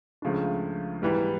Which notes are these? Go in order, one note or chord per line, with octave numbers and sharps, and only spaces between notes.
C#2 C#3 F3 A3 D4
G#2 E3 G3 B3